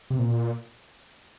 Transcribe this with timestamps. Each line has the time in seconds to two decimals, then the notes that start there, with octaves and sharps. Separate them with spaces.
0.10 C3
0.19 A#2